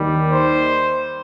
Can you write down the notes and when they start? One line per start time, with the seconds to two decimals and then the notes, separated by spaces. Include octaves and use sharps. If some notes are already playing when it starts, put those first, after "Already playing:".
Already playing: D#2 D#3 G3
0.31 C5